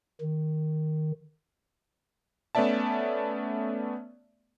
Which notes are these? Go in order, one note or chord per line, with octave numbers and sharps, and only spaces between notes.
D#3
A3 B3 C#4 D5 E5 A5